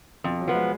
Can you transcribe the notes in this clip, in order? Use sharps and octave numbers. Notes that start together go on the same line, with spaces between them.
F2 B2
F#3
F3 B3
G#3